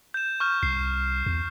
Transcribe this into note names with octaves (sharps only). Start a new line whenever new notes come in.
G6 E7
C#6 F6 G6
C2 C7
E2